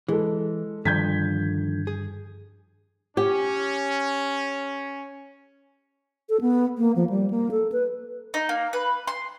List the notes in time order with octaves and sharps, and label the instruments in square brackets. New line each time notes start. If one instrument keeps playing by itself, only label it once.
[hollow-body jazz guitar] E3 [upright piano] G#3 A4
[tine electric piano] G2 [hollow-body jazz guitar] D3 D#3 F3 [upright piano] G6 G#6 B6
[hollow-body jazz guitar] G#4
[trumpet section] C#4 [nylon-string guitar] G4
[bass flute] A4
B3
A#3
F3
G3
A#3
A4
B4
[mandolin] D#4
A#3
B4
C6